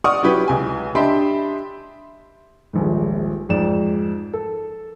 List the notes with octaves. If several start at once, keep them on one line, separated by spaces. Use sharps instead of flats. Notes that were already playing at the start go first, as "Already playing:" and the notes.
D5 F#5 C#6 D#6 F6
F#3 C#4 E4 G4 B4
C#2 G#5
D4 G4 D#5 E5 B5 C6
D#1 A#1 G#2
F2 G#2 D5 E7
A4